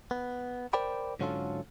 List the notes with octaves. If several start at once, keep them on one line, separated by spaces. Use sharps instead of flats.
B3
A#4 C5 D5 G5 B5
G#2 D3 F#3 C#4 F4 A4